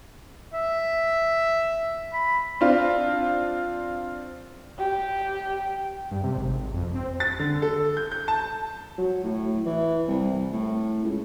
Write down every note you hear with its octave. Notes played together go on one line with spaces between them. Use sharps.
E5
B5
C4 D4 F4
G4
G2
C3
G#1
F2
C4
A6
D3
A4
G6
G6
A5
F#3
A2
E3
C2
A2
C#2